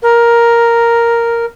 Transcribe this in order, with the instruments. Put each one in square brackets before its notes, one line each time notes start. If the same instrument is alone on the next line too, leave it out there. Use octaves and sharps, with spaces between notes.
[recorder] A#4